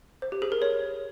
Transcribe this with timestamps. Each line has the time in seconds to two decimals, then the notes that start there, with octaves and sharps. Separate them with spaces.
0.22 C5
0.32 G4
0.42 G#4
0.52 A#4
0.62 C#5